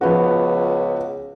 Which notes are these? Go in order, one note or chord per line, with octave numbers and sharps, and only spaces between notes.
C#2 F3 B3 F#4